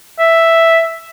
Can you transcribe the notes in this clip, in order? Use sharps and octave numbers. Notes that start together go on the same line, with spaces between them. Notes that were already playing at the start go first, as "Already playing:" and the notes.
E5